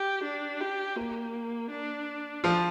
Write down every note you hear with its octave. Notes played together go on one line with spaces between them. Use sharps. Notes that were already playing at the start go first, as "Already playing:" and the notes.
Already playing: G4
D4
G4
A#3
D4
F3 F4